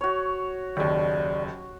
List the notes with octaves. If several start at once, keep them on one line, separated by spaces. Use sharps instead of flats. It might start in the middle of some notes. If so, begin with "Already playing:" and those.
F#4 C#5
F#1 D#2 D5